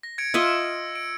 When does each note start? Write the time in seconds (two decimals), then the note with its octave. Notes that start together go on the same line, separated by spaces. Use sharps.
0.03 A#6
0.18 G#6 C#7 D7
0.34 F4 D#5 E5 E6 C#7 D7
0.95 D7